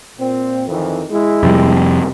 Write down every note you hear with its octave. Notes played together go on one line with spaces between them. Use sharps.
A#2 C4
F2 D#3 E3
G#3 E4
F2 C3 G3